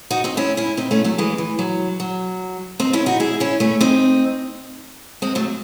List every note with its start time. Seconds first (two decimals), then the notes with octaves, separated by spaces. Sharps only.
0.10 D#4 F#4
0.24 C4 D#4
0.37 C#4 E4
0.57 C#4 E4
0.77 C4 D#4
0.91 A3 C#4
1.04 F#3 A3
1.18 E3 G#3
1.38 E3
1.59 F#3
2.00 F#3
2.80 C4 D#4
2.93 C#4 E4
3.06 D#4 F#4
3.20 E4 G#4
3.40 C#4 E4
3.60 A3 C#4
3.81 C4 D#4
5.22 G#3 C4
5.35 F#3 A3